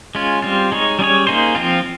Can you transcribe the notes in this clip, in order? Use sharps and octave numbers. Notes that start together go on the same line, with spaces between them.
G#3 C#4 F4
G3 C4 F4
G#3 D#4 G#4 C#5
G3 C#4 G#4 C#5
A#3 D#4 G#4 C5
F3 C4 F4